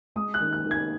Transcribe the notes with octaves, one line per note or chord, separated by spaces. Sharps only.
G#3 D#6
F#6
D#3
F#6
D#3
G#6